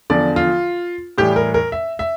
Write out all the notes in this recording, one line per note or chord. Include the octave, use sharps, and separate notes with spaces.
E2 D3 F3 D5
F4
A2 E3 G3 G4
A#4
A#4
E5
E5